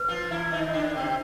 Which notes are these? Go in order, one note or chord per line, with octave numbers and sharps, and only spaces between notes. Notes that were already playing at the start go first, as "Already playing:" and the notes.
Already playing: B4
F3 F4
E3 E4
D#3 D#4
D3 D4
C3 C4